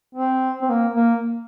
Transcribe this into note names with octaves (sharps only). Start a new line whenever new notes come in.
C4
C4
A#3
A#3